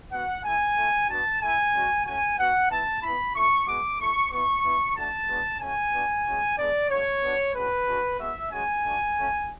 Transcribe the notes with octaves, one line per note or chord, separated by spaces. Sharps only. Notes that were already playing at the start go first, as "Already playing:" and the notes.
B3 F#4 F#5
A3 E4 G#5
A3 E4
B3 D4 F#4 A5
A3 E4 G#5
G#3 C#4 F#4
A3 C#4 F#4 G#5
B3 F#4 F#5
B3 E4 A5
B3 E4 B5
A3 E4 C#6
G#3 B3 F#4 D6
A3 E4 C#6
B3 E4 C#6
B3 E4
A3 D4 F#4 A5
G#3 B3 D4 F#4
A3 C#4 F#4 G#5
B3 D4 F#4
G#3 C#4 F#4
G#3 B3 D4 D5
A3 D4 F#4 C#5
B3 D4 F#4
G#3 C#4 F#4 B4
G#3 D4 F#4
G#3 B3 F#4 E5
G#3 C#4 F#4 G#5
A3 D4 F#4
A3 C#4 F#4